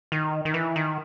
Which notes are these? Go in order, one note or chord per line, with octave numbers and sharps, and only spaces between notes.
D#3
D#3
E3
D#3